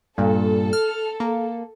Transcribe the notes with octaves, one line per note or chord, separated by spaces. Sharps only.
G2 A#2 A4
F6
A#3